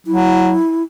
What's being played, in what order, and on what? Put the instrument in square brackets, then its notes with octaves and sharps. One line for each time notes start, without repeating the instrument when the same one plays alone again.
[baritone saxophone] F#3 [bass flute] E4